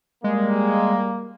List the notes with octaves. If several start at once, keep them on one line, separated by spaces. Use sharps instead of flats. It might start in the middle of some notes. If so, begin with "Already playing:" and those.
G3 G#3 A#3